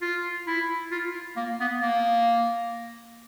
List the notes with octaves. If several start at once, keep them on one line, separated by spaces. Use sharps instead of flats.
F4
E4
F4
A#3
B3
A#3